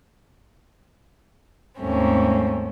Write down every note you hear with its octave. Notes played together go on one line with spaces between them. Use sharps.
D#2 G#2 A3 C4 C#4